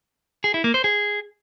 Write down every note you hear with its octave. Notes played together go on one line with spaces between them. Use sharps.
G#4
E4
A#3
C5
G#4